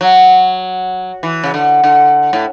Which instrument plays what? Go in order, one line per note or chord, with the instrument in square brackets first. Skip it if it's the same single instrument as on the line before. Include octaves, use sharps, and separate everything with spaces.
[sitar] F#3
E3
C#3
D3
D3
A2